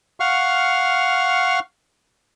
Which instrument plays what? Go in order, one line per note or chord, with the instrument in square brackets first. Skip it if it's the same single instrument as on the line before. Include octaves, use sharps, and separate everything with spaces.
[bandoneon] F5 F#5 C#6 F6